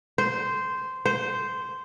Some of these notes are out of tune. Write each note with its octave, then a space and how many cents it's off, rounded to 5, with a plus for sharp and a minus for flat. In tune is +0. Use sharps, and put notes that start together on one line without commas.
C5 -10
C5 -10